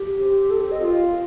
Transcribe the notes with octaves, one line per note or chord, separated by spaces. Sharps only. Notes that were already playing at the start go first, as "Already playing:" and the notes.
Already playing: G4
C4
A4
G4
D#5
F4